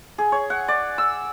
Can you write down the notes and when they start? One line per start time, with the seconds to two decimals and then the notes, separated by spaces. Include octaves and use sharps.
0.18 G#4
0.32 C#5
0.50 F#5
0.68 D5
0.98 E6